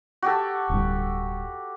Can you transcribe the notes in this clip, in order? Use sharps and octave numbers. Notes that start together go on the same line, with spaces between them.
F#4 G4 A4
D1 G2